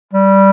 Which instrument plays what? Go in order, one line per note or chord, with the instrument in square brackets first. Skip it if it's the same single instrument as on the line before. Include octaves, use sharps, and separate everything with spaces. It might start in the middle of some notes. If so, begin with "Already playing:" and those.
[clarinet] G3